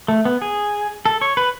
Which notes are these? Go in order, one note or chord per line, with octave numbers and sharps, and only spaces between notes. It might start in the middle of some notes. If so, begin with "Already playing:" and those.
A3
B3
G#4
A4
C#5
B4